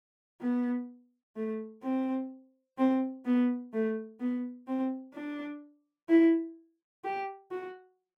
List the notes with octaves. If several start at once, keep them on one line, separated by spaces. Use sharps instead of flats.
B3
A3
C4
C4
B3
A3
B3
C4
D4
E4
G4
F#4